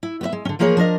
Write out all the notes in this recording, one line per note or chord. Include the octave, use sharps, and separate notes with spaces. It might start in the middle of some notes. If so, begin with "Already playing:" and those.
E4
B3 B4 E5
G#3
D3 C#4
E3 F3 A#3 G#4 A#4 C#5
F3 D4 A#4 D#5